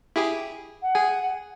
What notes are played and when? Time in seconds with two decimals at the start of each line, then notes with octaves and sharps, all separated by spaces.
0.16 E4 G4 G#4
0.82 F#5
0.95 G#4 G#5